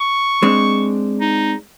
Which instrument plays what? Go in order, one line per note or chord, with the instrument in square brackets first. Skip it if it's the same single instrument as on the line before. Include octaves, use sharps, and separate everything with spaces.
[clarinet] C#6
[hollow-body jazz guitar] G#3 C4 D4
[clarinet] D#4